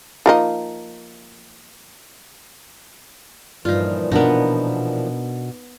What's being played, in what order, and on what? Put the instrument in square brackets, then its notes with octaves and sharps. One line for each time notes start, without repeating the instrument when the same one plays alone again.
[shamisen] F3 A#3 D#4
[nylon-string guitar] G2 [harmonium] A#2 E3 F3 [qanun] D#4 F4
[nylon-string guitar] B2 D4 A#4 [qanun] B3 D#4